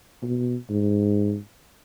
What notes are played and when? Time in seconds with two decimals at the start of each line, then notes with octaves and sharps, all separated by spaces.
0.22 B2
0.70 G#2